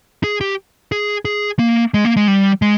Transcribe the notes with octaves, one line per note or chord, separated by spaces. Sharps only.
G#4
G4
G#4
G#4
A#3
G#3
A#3
G#3
G3
G#3